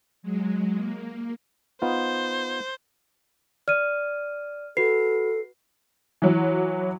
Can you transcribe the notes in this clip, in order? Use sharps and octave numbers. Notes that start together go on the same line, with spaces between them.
F#3 G#3
A#3
B3 D#4 F4 C5
D5 F6 D#7
F#4 A4 B4 C7
E3 F#3